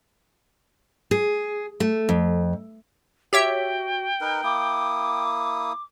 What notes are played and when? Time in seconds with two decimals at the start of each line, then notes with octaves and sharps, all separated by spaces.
1.11 G#4
1.80 A3
2.09 F2
3.33 F#4 G4 C#5 E5 G5
4.21 D#4 A#4 B4
4.44 A#3 E4 D6 D#6